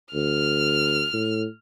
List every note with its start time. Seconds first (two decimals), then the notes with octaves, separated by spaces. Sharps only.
0.14 D2 F6
1.13 A2